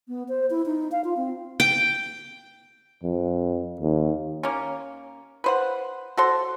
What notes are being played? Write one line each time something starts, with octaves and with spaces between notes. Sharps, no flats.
B3
C5
E4
D#4
F5
F4
C4
G5
F2
D#2
A#3 C#4
B4 C5 F#5
F#4 A4 C5 C6